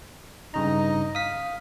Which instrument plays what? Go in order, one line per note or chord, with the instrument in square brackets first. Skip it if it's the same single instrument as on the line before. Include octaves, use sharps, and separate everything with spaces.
[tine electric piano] G2 C#3 A#5 [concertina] D#4 D#5
[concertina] F5 [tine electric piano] D#6 B6